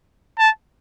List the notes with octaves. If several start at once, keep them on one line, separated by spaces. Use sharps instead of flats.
A5